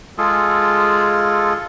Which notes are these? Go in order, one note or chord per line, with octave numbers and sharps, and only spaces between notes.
G#3 F4 G#4 A4